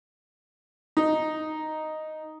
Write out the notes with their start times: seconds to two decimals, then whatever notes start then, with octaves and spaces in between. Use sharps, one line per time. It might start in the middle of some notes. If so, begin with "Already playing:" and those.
0.97 D#4